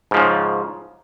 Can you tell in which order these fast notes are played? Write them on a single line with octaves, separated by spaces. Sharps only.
G#2 F3 C#3